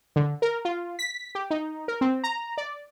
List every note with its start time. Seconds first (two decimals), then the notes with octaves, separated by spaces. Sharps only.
0.16 D3
0.42 A#4
0.65 F4
0.99 B6
1.35 G4
1.51 D#4
1.88 A#4
2.01 C4
2.24 A#5
2.58 D5